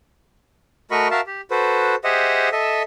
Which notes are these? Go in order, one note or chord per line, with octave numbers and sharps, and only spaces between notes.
A3 F#4 A#4 D#5 B5 C#6
F#4 A#4 E5 F5 A5
G4
F#4 A4 B4 C5
G4 G#4 C5 D#5 E5 F#5
A4 D#5 E5